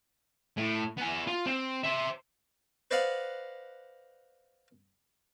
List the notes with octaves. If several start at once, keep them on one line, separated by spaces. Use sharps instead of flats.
A2
B3 G#5
F4
C4
C5 E5
B4 C5 D5 D#5 F5 F#5